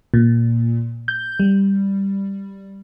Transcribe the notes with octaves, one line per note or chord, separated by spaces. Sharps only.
A#2
G6
G3